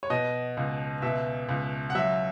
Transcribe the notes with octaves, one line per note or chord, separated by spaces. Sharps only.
C#5
B2 D#5
C#2
B2 E5
C#2
F#5
F#3 E5